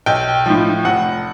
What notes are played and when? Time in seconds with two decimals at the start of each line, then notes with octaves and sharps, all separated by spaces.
0.06 B1 G5
0.46 A2 F3
0.85 F1 F#5